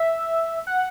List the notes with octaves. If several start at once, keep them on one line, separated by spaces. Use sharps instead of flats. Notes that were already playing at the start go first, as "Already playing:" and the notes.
Already playing: E5
F#5